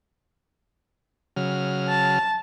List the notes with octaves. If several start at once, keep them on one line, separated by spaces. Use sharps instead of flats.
C#3 F#3 F6
A5